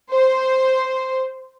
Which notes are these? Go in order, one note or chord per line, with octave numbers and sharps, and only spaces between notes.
C5